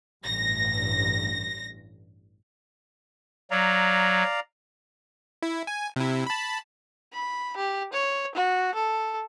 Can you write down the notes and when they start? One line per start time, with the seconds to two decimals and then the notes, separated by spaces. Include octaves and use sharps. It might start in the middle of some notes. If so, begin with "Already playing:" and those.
0.24 A1 G2 A#6
3.51 F#3 D5 F5 A#5
5.42 E4
5.67 G#5
5.96 C3 E4
6.27 A5 B5
7.13 B5
7.57 G4
7.93 C#5
8.35 F#4
8.75 A4